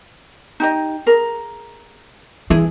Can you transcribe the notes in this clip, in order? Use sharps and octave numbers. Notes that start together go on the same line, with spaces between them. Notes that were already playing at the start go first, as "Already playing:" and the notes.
D#4 G4 D#5
G#4 A#4
E3 E4 G#4